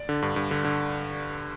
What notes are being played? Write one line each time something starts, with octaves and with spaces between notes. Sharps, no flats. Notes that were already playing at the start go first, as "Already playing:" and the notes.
Already playing: D5
D3
G2
G2
D3
D3